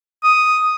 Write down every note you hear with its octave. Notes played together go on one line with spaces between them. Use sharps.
D#6